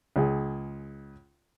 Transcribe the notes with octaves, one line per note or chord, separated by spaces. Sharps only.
C#2 G#4